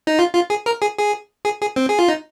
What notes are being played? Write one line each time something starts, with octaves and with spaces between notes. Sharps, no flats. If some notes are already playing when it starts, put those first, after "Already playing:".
D#4
F4
F4
G#4
A#4
G#4
G#4
G#4
G#4
C4
G#4
F4
D#4